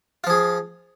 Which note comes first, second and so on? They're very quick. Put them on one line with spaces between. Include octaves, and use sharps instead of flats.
F4 F3 G#4